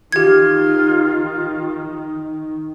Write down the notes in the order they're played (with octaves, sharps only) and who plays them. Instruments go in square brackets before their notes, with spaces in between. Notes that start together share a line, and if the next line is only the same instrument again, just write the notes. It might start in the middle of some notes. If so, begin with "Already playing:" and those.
[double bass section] D#3 [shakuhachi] F4 [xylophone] G4 G#6